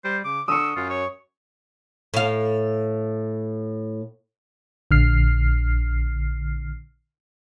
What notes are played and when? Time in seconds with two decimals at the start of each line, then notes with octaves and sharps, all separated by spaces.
0.04 G3 C5
0.25 C#3 D6
0.48 D3 C#6 D#6 E6
0.76 F#2 F4
0.90 C#5
2.14 A2 F5
4.91 A#1 D3 F6 C7